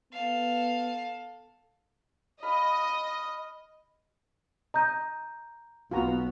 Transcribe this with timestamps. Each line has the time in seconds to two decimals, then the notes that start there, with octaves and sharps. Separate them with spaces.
0.13 B3 A4 F5
2.43 D#5 F5 B5
4.74 D#5 A#5 G6
5.91 B1 B3 F4 F#4 A#5